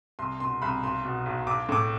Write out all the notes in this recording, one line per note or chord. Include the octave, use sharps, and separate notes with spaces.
C2 C6
B2 C6
C2 B5
B1 C6
B2
B1
B1 D6
A2 D6